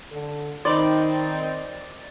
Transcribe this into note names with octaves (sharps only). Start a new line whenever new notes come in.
D3 A4
D#3 C4 D#4 C5 D5 B5 C6